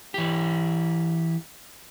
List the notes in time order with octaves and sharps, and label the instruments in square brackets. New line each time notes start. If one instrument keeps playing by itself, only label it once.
[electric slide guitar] E3 G4